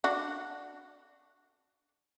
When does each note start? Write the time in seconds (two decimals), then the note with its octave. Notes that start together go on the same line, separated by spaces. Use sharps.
0.04 D4 F#4